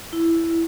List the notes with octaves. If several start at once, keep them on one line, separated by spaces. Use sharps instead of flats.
E4